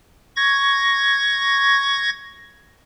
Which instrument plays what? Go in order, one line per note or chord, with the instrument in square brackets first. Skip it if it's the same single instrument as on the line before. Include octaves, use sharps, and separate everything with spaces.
[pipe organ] C#6 G#6 A#6